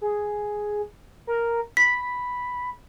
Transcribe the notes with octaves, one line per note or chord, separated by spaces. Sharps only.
G#4
A#4
B5 B6